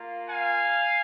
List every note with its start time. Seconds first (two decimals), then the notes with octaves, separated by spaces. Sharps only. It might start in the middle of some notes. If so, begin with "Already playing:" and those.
Already playing: A#3 F4
0.29 F5 G#5